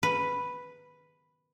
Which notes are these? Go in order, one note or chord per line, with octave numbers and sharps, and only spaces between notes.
B4